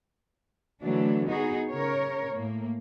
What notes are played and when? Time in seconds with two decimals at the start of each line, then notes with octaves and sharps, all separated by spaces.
0.82 D3 E3 F#3 A3 D4
1.28 B3 D#4 F#4 G#4
1.70 C#3 A#4 C#5
2.34 A2 A#3